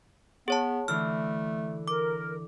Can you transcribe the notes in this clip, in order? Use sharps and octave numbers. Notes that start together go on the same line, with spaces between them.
B3 G#4 C#5 A5
D3 E3 A3 F6
A#4 D6